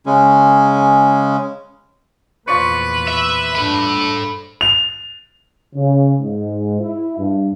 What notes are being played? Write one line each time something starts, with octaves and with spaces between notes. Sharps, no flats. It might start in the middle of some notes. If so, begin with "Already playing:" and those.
C#3 G#3 C#4
E2 A#2 F3 B4 D5 C#6
E5
G2 D4 A4 B5
F7
C#3
G#2
E4
G2